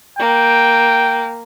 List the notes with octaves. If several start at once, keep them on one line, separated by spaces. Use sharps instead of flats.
A#3 G5